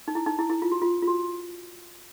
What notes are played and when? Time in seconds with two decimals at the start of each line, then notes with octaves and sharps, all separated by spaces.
0.08 D#4
0.15 E4
0.26 D#4
0.39 E4
0.50 E4
0.62 F4
0.72 F#4
0.82 F4
1.02 F4
1.07 F#4